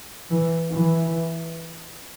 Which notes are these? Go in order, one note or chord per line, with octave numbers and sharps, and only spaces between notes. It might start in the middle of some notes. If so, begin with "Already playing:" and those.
E3
E3